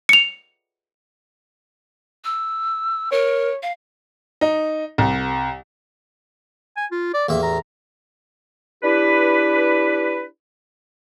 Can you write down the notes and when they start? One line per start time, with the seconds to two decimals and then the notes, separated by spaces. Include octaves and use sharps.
0.09 C#7 F7
2.24 E6
3.12 A#4 C#5
3.63 F5
4.41 D#4
4.98 C2
6.76 G#5
6.91 F4
7.14 D5
7.29 A1 E2 A#3 E5
7.43 A#5
8.83 D4 E4 G4 B4